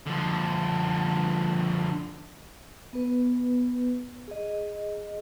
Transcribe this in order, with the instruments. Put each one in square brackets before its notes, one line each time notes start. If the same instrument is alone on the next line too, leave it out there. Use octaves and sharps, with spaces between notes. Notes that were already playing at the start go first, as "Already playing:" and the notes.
[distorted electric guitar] D3 F3
[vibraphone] B3 B4
G#4 D#5